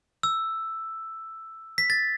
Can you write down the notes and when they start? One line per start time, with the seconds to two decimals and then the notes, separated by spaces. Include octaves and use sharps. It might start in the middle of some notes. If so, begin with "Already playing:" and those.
0.23 E6
1.78 B6
1.90 A6